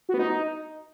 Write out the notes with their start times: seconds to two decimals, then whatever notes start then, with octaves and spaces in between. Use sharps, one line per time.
0.09 F#4
0.14 B3
0.19 D#4